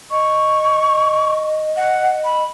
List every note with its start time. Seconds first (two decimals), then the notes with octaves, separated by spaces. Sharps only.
0.11 D#5 C#6
1.77 F#5
2.25 B5